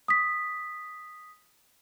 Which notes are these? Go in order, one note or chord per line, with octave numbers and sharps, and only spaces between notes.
D#6 B6